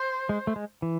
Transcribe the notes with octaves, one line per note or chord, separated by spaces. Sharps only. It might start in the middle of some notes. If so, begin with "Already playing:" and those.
Already playing: C5
G#3
A3
G#3
E3